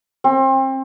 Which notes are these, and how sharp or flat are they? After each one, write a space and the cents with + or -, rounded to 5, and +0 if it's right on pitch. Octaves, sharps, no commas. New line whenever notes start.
C4 +30